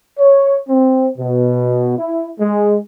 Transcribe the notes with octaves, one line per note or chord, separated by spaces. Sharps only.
C#5
C4
B2
E4
G#3